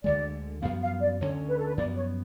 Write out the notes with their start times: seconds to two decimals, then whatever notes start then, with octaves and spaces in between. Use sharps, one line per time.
0.04 D2 D3 G#3 D5
0.62 F#2 F3 B3 F5
0.82 F5
1.00 D5
1.20 D2 D3 G#3 C#4 C#5
1.49 B4
1.58 A4
1.67 B4
1.77 F#2 F3 B3 D5
1.96 C#5